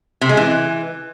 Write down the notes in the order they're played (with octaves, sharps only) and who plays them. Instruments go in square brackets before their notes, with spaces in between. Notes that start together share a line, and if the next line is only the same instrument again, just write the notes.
[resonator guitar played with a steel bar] C3
G#3
E3